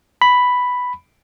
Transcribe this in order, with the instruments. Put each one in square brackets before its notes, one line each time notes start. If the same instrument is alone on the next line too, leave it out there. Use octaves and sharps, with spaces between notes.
[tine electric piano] B5